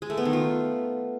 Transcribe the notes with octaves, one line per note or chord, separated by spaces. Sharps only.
G#3
A3
B3
D#3
F4